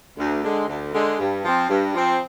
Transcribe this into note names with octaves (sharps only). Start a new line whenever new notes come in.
D2
D3 G#3
D2
D3 G#3
G2
F3 C4
G2
F3 C4